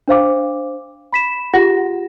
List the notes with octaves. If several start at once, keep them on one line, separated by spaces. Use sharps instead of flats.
D4 C5 F5 D6
B5 B6 E7
F4 G4 G#4 F#5 A#6